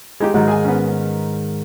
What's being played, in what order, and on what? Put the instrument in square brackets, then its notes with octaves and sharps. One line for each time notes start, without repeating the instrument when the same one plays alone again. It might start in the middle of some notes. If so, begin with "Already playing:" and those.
[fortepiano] G#3 D#4 G4
[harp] G#2 D#3 [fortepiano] F#3
[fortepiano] G#4 G#5
B3 C#4